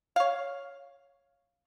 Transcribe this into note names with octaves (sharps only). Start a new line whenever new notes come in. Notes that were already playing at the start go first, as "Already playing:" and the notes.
C#5 F5